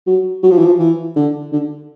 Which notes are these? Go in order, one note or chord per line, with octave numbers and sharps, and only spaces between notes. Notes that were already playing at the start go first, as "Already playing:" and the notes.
F#3
F#3
F3
E3
F3
E3
D3
D3